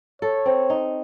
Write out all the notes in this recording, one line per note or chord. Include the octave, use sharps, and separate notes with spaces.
A4 C#5
C4
D#4